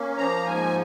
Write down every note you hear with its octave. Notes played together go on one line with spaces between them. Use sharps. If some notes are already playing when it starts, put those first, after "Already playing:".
Already playing: A#3 C#4
F3 A#5
G#2 G#5